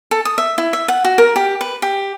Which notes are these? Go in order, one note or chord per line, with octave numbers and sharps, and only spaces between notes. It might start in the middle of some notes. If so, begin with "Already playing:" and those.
A4
D#6
E5
E4
E5
F#5
F#4
A#4
G4
B4
G4